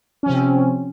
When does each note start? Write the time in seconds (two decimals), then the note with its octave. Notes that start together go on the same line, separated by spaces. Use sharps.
0.23 C#4
0.26 F3
0.30 C3
0.33 C4